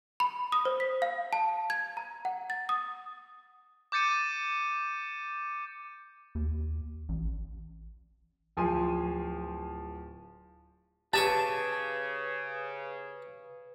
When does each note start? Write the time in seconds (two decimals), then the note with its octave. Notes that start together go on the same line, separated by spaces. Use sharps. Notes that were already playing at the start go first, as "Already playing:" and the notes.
0.20 B5
0.52 D#6
0.65 C5
0.80 B6
1.02 F5
1.33 A5
1.70 G#6
1.97 A#5
2.25 F#5
2.50 A6
2.69 D#6
3.92 D6 G6 A6 C#7 D#7
6.35 D#2
7.09 A1
8.57 D1 F3 G#5 C6 D#7
11.13 C#3 G4 B4 G#5 A5 C#6